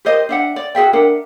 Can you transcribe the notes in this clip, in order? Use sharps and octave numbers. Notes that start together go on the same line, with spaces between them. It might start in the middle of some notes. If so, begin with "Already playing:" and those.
G4 A#4 C5 D#5
D4 E5 F#5
D5
F#4 G#4 E5 G5
D4 A#4 E5 F#5